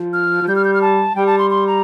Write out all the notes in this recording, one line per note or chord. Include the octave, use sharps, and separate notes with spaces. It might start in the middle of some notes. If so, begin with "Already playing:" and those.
Already playing: F3
F6
F3
G3 G6
F6
G6
F6
A5
G3 G5
A5
C6
C6
A#5